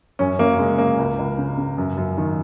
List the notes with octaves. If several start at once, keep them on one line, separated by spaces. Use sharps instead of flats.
F#2 C#4
F#2 A#3
C#3 G#3
C#3 A#3
C#2
C#2
C#3
C#3
F#2
F#2
D#3